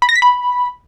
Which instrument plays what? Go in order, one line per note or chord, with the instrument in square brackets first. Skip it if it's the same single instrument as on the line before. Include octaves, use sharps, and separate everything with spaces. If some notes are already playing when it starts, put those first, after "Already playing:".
[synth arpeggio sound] B5
A#6
B6
B5